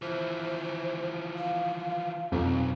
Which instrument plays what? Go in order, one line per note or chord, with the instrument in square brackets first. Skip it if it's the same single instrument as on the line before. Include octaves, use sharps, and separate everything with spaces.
[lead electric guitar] E3 F3 [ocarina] C5
[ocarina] F5
[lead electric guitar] B1 [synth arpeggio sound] F2